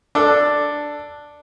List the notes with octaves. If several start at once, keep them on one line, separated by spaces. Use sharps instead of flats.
D4 A4